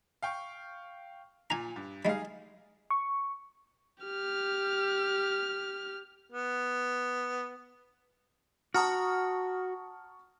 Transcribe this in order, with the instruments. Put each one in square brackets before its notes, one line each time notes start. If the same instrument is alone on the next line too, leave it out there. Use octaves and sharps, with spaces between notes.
[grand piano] F5 G5 C#6
[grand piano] A#2 [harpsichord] G#5 A#5
[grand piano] G2
[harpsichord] G3 G#3 [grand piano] D#4 G#4 F5
[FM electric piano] C#6
[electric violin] G4 F6
[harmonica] B3
[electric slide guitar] F#4 [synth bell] F#5 A#5 D#6 [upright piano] A5 C#6 F6